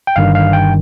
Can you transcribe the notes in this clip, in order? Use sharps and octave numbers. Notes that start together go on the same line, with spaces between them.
G5
G1 G2 D#3 F5
F5
G5